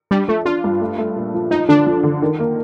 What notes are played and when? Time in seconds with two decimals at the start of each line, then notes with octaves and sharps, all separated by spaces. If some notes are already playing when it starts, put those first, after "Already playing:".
0.11 G3 D4
0.28 F3 A3
0.46 D4 F4
0.64 G2
0.81 A3
0.98 A3
1.16 A#2
1.34 F3
1.51 F3 D#4
1.68 D3 D4
1.86 F3
2.04 D3
2.22 D#3
2.40 A#3